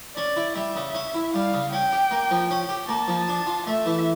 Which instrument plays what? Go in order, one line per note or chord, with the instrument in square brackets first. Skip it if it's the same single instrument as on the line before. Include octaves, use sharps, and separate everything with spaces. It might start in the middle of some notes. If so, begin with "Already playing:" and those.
[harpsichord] C#4 [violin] D5
[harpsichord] E4
[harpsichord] G3 [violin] E5
[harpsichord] C#3
C#4
E4
[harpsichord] G3 [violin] F5
[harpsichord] C#3
[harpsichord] C#4 [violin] G5
[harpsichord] G4
A#3
F3
[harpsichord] C#4 [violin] G5
[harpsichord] G4
[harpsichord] A#3 [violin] A5
[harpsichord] F3
D4
F4
[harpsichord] A3 [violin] E5
[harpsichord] E3